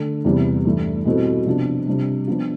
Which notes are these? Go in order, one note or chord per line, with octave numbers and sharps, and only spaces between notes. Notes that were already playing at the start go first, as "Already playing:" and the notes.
Already playing: D3 A3 D4
E2 C3 E3 G3 B3
G2 E3 A3
B2 G3 C4 E4 A4
C3 F3 B3 D4
C3 G3 D4
F3 B3 D4 F4